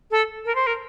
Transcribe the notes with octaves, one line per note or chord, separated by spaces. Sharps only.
A4
A#4
C5
A#4